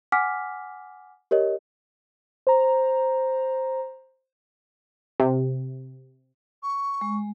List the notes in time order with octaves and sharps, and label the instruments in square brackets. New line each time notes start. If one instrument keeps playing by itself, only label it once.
[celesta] F#5 G#5 D6 F6 B6
G4 A#4 C#5 D#5
[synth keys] C5 A#5
[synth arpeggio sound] C3
[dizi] C#6
[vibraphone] G#3